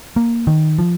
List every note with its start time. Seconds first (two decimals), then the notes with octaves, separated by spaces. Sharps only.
0.16 A#3
0.47 D#3
0.79 F3